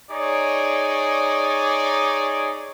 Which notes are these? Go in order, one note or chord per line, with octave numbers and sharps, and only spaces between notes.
D#4 G#4 C#5 D5